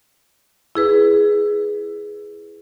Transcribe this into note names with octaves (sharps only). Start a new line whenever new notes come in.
E4 G#4 B4